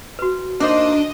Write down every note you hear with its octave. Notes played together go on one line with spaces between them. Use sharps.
F#4 B4
A#3 D4 D#4 C5 D#5